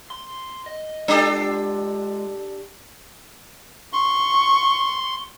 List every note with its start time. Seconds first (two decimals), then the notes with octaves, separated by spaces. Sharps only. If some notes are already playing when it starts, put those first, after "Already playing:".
0.10 C6
0.66 D#5
1.08 G#3 D4 F4 G4 A4
3.93 C6 C#6